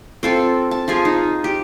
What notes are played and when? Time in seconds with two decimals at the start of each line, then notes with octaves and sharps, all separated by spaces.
0.23 C4 F4 A4
0.71 A5
0.88 F3 F4 G#4
1.05 D#4
1.44 G4